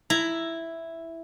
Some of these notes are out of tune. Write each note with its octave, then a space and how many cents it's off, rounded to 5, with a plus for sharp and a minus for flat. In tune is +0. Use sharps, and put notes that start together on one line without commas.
E4 +0 A#5 +0